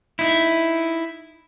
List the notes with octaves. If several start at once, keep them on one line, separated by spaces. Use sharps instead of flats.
D#4 E4